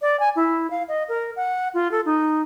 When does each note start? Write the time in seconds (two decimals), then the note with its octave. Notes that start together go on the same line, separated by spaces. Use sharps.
0.02 D5
0.20 G#5
0.36 E4
0.70 F5
0.88 D#5
1.09 A#4
1.36 F#5
1.74 F4
1.91 A4
2.05 D#4